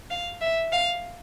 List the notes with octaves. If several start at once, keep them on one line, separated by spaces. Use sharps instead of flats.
F5
E5
F5